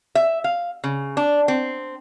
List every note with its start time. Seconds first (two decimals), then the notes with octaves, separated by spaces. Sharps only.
0.15 E5
0.44 F5
0.84 C#3
1.17 D4
1.48 C4